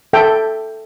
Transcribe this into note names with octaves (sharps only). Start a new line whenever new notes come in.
A4 E5 G5